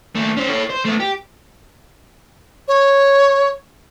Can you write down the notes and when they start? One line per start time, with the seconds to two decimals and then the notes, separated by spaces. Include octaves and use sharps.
0.15 D#2 A3
0.37 C#4 C5
0.50 A4 C#5
0.70 C5
0.85 A3 B3
1.00 G4
2.68 C#5